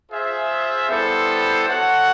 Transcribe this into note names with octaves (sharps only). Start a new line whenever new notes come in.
F4 G#4 C5 E5
G3 B3 E4 A4 C5
F#4 A4 C#5 F#5